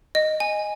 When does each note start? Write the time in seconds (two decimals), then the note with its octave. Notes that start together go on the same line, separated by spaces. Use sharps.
0.15 D#5
0.40 G#5